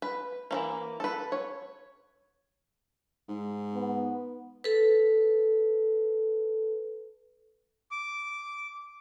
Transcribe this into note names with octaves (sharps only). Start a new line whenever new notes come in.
B4
E3 F#3 A#3
A4 B4
C#5
G#2
B3
A4 B4
D6